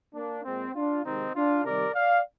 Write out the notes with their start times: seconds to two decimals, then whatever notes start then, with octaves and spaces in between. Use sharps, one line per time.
0.15 A#3 D4
0.45 A#2 G#3 C4
0.75 D4 F4
1.05 C3 D#3 G#3 C4 D#4
1.36 D4 F4
1.65 C3 D#3 G3 A#4 D5
1.94 D5 F5